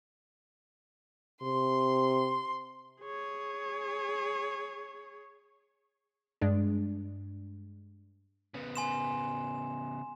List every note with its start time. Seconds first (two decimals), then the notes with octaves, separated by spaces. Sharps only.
1.42 C3 C6
3.01 G#4 C#5
6.41 G2 G#3 D4
8.54 C#3 B3
8.76 G#5 C6 E7